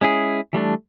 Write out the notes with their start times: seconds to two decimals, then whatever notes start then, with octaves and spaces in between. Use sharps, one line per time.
0.01 G#3 C#4 E4 G#4
0.53 E3 G3 A3 D4